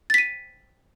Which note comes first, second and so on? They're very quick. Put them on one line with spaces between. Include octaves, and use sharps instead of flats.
A6 B6 D#7